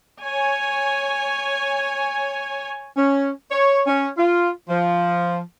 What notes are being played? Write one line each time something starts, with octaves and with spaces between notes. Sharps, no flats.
C#5 G#5
C#4
C#5
C#4
F4
F3